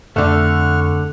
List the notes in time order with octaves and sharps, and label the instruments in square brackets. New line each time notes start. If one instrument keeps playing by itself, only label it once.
[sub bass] F2 [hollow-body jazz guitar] D3 A3 [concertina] F#5 C#6 F6